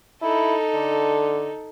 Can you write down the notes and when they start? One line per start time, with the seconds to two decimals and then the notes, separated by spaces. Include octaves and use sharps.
0.22 D#4 E4 A4
0.74 D3